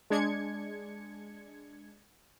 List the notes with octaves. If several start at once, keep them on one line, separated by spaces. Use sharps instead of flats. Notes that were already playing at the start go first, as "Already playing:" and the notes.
G#3 D4 G#6 C#7